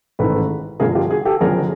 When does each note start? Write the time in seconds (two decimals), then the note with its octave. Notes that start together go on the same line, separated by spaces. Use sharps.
0.19 A1 G#2 D#3 A4 B4
0.80 G1 G2 D3 F3 G#4 A#4
0.95 F4 G4
1.10 F#4 G#4
1.25 G4 A4
1.41 F#1 F#2 D3 F3 G#4 A#4